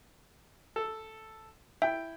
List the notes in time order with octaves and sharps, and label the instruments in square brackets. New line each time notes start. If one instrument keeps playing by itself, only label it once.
[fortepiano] A4
[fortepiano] E4 G5 [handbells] E5